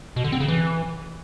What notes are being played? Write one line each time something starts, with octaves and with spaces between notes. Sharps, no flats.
B2
D3
C4
C#3
E3